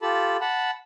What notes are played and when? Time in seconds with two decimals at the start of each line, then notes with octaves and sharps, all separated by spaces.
0.02 F4 G4 A4 A5 B5
0.41 F#5 A5 B5